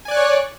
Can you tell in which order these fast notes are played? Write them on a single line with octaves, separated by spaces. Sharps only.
G#5 D5 F#6 C#6 C#5